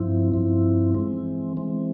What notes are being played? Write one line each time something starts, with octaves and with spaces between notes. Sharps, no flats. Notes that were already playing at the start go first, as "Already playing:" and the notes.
Already playing: G2 F3 C4 E4
G2 F3 C4 E4
E3 G#3 C4
E3 G#3 C4